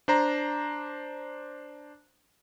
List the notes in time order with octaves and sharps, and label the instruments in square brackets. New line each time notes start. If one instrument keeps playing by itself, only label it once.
[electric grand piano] D4 C5 A#5